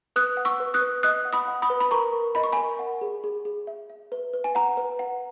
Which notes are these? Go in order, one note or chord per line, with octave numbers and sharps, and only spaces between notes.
B4 D#6 F#6
F#5
C#6 E6
B4
D#6 F#6
B4
D#5 D#6 F#6
F#5
B5 D#6
F#5
B5 D#6
B4
B5
A#4 A#5 C#6
A#4
D#5 B5
C#6
A#4 G#5 B5
F#5
G#4
G#4
G#4
E5
E5
B4
B4
G#5
F#5 A#5
B4
F#5